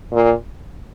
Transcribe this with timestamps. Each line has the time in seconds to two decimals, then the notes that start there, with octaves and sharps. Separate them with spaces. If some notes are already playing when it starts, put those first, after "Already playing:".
0.13 A#2